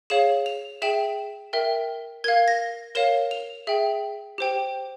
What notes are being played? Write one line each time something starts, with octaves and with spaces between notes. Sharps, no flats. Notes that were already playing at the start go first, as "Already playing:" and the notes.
G#4 C#5 F5 E7
F7
G#4 E5 G5 E7
A#4 E5 G5
A#4 F5 G#6
A#6
A#4 C#5 F5 E7
F7
G#4 E5 G5
G4 C5 G5